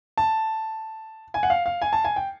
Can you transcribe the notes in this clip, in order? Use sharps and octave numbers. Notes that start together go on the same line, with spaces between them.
A5
G#5
F#5
F5
F5
G#5
A5
G#5
G5